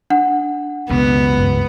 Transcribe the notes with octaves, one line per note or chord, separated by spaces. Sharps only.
D4 F#5
C#2 F#2 B2 B3
G2